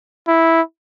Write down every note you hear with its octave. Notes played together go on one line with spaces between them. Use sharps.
E4